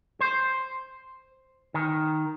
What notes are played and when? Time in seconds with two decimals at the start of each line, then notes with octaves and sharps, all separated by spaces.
0.21 C5
1.74 D#3